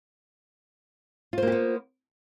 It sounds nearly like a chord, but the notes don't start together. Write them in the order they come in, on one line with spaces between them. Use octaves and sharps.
F4 C5 A#3 G4 B3